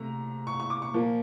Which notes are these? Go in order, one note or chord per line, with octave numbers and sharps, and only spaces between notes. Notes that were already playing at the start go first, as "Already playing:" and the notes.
Already playing: C3 A3 A#5
C#6
C#6
D6
C#6
A#2 F3 A#3